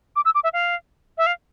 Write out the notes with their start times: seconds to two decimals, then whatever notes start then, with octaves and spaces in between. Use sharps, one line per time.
0.16 D6
0.25 E6
0.35 D6
0.44 E5
0.53 F5
1.18 E5
1.26 F5